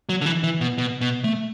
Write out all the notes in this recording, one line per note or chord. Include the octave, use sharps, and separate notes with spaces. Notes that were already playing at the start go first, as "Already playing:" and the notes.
F#3
D3
E3
E3
B2
B2
B2
A3